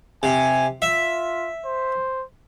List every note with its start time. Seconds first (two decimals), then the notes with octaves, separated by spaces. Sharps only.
0.23 C3 G#5
0.82 F4 E5
1.66 C5